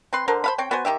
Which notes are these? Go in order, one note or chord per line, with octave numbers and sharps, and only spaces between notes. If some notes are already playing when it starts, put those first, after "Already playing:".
C4 B4 C6
D3 A#4 C5
C5 F5 B5
C4 C#5 G5
B3 F#4 C5 G#5
D#3 C4 G4 E5